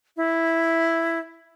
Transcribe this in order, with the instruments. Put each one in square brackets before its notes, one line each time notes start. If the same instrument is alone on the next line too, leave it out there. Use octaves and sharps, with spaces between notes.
[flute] E4